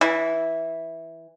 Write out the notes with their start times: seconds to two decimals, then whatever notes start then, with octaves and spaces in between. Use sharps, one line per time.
0.01 E3